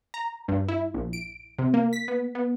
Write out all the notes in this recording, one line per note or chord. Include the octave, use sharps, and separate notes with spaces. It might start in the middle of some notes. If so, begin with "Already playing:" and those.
A#5
G2
E4
A#1
D7
C3
A#3
B6
B3
B3